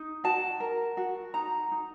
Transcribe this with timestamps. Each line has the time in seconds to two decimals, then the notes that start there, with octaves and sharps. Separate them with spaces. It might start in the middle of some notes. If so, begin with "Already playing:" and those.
Already playing: D#4
0.24 F#4 A5
0.60 A#4
0.97 F#4
1.34 D#4 A#5
1.72 D#4